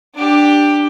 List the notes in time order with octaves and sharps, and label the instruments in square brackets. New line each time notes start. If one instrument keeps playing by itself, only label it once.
[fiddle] D4 G4